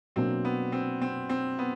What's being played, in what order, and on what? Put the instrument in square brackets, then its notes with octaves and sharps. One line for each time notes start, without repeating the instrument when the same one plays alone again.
[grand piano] B2 F#3 A#3 D4 [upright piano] C4
[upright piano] B3
C4
C4
C4
B3